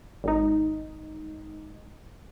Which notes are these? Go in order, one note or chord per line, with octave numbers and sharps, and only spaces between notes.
G#1 D#4